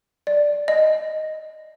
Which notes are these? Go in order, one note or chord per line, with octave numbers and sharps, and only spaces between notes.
D5
D#5